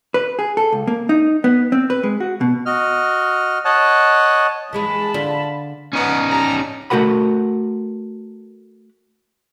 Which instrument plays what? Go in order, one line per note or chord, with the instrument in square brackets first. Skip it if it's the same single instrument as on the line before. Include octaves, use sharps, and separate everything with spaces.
[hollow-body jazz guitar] B4
G#4
A4
C#2
A#3
D#4
B3
C4
B4
G#3
F#4
B2
[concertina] F#4 D#5 F6
C#5 D#5 F#5 A5
[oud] E3 G#3 G#4 [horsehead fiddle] A5 B5
[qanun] D3 [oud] F4
[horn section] B3 [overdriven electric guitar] C#4 D#4
[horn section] G4 A5 A#5
[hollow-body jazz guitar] A3 F#4 A#4 F#5 B5